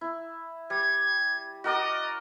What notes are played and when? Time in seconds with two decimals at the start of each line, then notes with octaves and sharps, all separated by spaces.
0.01 E4
0.70 G3 G#6
1.64 F#4 A#4 D5 D#5